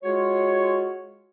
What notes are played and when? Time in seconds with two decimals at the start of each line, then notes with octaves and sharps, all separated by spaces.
0.03 G#3 F4 F#4 G#4 C#5